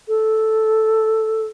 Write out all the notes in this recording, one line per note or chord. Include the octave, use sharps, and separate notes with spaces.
A4